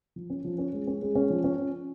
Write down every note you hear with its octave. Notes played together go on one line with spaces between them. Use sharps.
F3
C#4
F3
C#4
G#3
C#4
G#3
C#4
F3
C#4